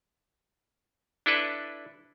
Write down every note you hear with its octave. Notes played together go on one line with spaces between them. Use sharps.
D4 E4 A4 B4